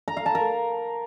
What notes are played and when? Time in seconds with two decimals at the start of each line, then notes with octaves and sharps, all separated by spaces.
0.08 A#5
0.17 F5
0.26 A5
0.35 A#4